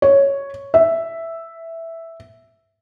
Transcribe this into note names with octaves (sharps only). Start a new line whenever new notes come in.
C#5
E5